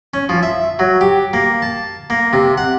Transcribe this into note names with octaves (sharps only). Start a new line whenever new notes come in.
C#4
F3
E5
F#3
G4
A#3
A5
A#3
C3
F#5